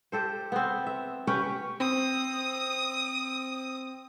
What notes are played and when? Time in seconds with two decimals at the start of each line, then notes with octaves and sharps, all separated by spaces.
0.12 G4 A4 C5
0.52 B3 C4
0.87 E5
1.27 C#4 G4 B4 C#5
1.80 C4 D#6